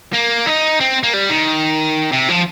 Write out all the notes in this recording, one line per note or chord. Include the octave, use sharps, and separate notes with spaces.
A#3
D#4
C4
A#3
G3
D#3
C3
F3